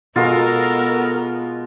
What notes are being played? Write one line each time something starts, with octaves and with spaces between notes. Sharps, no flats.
B2 G#3 B3 F4 F#4 A4 A#4